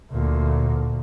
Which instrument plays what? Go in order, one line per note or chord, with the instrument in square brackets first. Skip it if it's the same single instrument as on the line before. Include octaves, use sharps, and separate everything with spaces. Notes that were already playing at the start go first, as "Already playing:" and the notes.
[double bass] D2 A#2